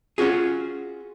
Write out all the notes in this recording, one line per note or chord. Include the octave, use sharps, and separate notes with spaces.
C#4 F4 F#4 G#4